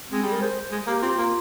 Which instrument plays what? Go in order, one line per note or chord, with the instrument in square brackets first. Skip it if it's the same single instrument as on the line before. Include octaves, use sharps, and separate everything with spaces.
[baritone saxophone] G#3 [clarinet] C4
[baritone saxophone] G3 [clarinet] G#4
[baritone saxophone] G#3 [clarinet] A#4
[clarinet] C5
[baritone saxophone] G#3
[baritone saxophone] A#3 [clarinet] G4
[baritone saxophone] C4 [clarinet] F4
[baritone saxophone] A#3